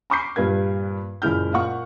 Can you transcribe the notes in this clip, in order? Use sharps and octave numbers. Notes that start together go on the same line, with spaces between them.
A#5 B5 C#6 D6 G6 C7
G2 A#2 B4 G#6
F#1 A#2 G#3 E4 F6 G6
A#2 A#3 F5 F#5 C#6